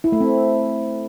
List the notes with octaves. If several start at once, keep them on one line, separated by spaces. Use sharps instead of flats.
E4
A3
C4